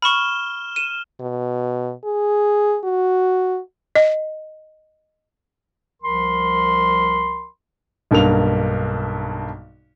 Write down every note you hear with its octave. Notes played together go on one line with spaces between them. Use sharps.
B5 C#6 F6 E7 G7
D#7 E7
B2
G#4
F#4
D#5
C2 F3 A#4 B5 C6
B1 G2 A#3 F7